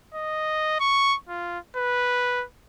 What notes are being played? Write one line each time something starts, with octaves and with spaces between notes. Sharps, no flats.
D#5
C#6
F4
B4